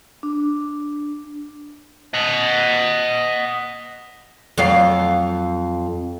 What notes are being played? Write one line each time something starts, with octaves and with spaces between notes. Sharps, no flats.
D4
D#5 F#5
F2 F#3 F5